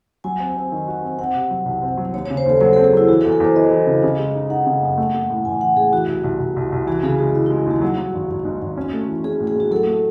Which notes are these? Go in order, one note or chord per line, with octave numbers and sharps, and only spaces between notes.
F#3 G#5
C4
C4
D#3
F#4
C4
C4 F#5
C3
F#3
C2
C4
F#3
D#2 C#5
C#3 C#5
C5
D#2 A4
F#3 A4
C4 A4
G#4
F#3 E4
E3 F#4
A4
E2
A4
E2 C5
E3 D#5
E3
C#3
C#3
G#3
D#4
D#4 F#5
C#3
F#2
A3
A3
A2
A1 G#5
E3 F#5
A2 G#4
E3 F#4
C2
C2
C2
C2
C2
E3 F#4
C#3 G#4
G#3 F#4
E3 E4
G#3 D#4
D#2 F#4
F#3 F#4
F#3
G#1
G#1
G#2
G#1
C#4
A3
E3
C#4 G#4
A2
G#4
A2 F#4
F#3 A4
A3